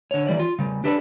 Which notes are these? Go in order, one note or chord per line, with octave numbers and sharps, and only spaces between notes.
D3 C#5
E3 G3 D5
F4
C#3 G3
D4 G4 A4 B4 C5 D5